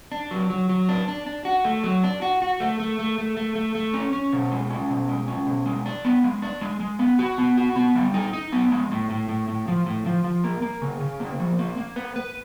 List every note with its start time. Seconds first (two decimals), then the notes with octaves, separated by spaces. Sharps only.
0.12 D4
0.31 F#3
0.50 F#3
0.69 F#3
0.89 D4
1.08 D4
1.26 D4
1.45 F#4
1.65 A3
1.84 F#3
2.04 D4
2.22 F#4
2.42 F#4
2.60 A3
2.80 A3
2.99 A3
3.18 A3
3.37 A3
3.55 A3
3.75 A3
3.93 C#4
4.13 C#4
4.33 B2
4.52 G#3
4.70 C#4
4.90 B2
5.08 G#3
5.28 C#4
5.47 B2
5.66 G#3
5.86 D4
6.05 B3
6.24 G#3
6.42 D4
6.61 G#3
6.80 G#3
6.99 B3
7.19 F#4
7.38 B3
7.57 F#4
7.76 B3
7.95 G3
8.14 D#4
8.33 D#4
8.52 B3
8.71 G#3
8.91 A2
9.10 A2
9.29 A2
9.48 A2
9.68 F3
9.86 A2
10.06 F3
10.24 F3
10.44 A#3
10.62 A#3
10.82 C#3
11.01 C#3
11.20 A#3
11.40 F3
11.59 A#3
11.77 A#3
11.96 B4
12.16 B4